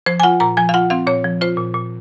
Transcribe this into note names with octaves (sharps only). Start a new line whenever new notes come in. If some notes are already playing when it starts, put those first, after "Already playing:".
F3 C5
G#5
F4 F#5
A#2 A#5
F3 G#5
F5
F4 F#5
C4 F5
A#2 C#5
F3
F4 C5
A#2
A#2